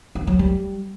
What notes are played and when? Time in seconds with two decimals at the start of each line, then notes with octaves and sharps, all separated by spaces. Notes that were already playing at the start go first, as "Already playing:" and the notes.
0.15 B3
0.27 F#3
0.39 G3